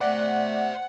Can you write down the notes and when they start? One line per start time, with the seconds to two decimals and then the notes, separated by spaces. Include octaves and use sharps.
0.01 A3 C5 D5 E5 F#5